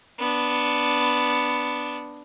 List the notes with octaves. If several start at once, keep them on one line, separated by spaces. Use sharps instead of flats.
B3 D4